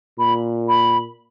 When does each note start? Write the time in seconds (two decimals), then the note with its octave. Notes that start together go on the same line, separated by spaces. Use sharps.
0.19 A#2 B5
0.68 B5